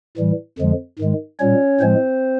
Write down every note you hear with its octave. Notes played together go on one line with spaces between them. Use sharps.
A2 E3 G3
F2 D3 F3 G#3
G#2 D#3 G#3
A#2 G3 C#4 C#5
A2 F3 G#3 C4 C5